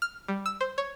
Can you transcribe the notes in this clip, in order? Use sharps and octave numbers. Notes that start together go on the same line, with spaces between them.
F6
G3
E6
C5
C#5